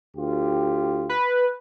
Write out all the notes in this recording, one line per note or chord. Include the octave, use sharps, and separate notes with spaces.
D2 F4 G4
B4